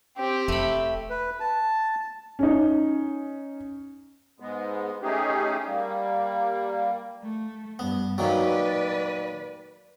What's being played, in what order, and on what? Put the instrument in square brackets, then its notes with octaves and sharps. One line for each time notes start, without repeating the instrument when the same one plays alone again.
[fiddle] C4 G4
[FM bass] E1 [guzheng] A3 B5
[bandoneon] B4
A5
[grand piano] C#4 D#4
[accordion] G#2 G#3 B3
A3 C#4 D#4 G4 G#4
G3 A#3
[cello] A3
[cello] G2 [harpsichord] B3
[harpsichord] A#2 D#3 F#3 [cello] B4 D5